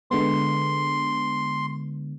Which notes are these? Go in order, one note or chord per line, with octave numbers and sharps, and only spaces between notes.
D3 G#3 B3 C6